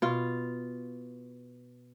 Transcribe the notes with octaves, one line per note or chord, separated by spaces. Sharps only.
B2 F4